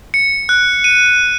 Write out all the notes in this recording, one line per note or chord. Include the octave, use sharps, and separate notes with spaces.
C#7
F#6
D#7